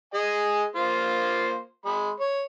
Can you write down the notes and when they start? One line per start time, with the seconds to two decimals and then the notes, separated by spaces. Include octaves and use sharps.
0.14 G#4 D#5 G#5
0.76 A#3 F4 C5
1.85 G#3 B5
2.20 C#5